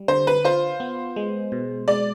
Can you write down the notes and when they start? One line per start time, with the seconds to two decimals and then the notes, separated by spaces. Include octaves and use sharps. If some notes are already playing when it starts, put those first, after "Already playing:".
Already playing: G3
0.08 D3 C5
0.27 B4
0.45 F4 C5
0.80 B3
1.16 G#3
1.52 B2
1.88 G#3 D5